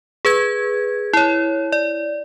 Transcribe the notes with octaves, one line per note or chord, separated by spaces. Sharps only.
G#4 B4 G#6
E4 C#5
D5